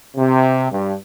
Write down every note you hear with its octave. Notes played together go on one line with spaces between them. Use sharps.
C3
G2